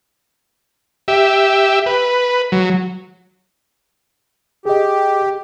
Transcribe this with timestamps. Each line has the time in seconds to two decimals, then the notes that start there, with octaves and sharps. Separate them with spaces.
1.08 G4 E5
1.86 B4
2.52 F#3
4.65 G4 G#4 D#5